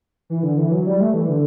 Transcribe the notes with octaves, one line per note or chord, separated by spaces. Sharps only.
E3
D3
E3
F#3
G3
A3
E3
D3